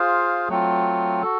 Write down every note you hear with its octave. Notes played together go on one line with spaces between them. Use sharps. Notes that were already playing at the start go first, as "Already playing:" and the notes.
Already playing: F4 G#4 C5 F5
F#3 A3 C4 F4
F#4 A4